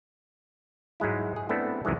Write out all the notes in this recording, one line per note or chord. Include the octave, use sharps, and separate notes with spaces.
G#2 F#3 G#3 E4
G#4
A3 B3 C4 D4 E4 A4
C2 F#2 D#3 E3 G#3